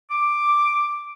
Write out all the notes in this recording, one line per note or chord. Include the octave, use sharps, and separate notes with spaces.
D6